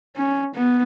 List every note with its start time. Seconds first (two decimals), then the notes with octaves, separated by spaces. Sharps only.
0.17 C#4
0.55 B3